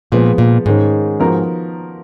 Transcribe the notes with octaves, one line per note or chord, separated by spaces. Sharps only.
A#2 F3 G#3 B3
A#2
G#2 D#3 G#3 C#4
F3 B3 D#4 F#4 A#4